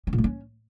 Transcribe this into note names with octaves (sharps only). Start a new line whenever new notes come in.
C#4
A#2
A3
C#4